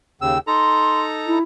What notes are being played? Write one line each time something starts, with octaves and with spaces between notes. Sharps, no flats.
D#2 C#3 G5 E6
D#4 A4 A#5 C6
E4